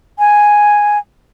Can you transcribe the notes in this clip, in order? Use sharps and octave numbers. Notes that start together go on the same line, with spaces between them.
G#5